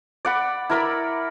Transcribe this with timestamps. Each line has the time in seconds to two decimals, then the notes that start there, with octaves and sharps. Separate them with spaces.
0.25 D5 F#5 B5
0.69 E4 A#4 D5 B5